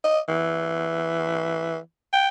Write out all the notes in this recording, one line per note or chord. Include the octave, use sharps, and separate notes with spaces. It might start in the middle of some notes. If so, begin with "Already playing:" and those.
D#5
E3
G5